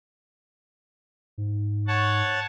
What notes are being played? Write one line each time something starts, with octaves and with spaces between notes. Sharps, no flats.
G#2
C#5 F#5 A5